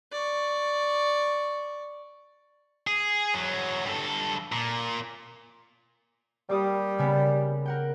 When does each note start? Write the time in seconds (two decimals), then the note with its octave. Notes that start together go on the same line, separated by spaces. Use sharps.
0.12 D5 C#6
2.87 G#4
3.34 E2 F#3
3.86 G2 A4
4.52 A#2
6.49 G3 A#3 D6 D#6
6.98 C#3 A#3 B3
7.66 A#4 F#5 G5